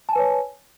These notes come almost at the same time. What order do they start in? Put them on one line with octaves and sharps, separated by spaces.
A5 G#5 B4 C#5